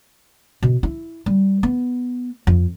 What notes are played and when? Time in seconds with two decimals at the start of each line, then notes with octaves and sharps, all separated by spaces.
0.63 B2
0.83 E4
1.26 G3
1.63 B3
2.47 F2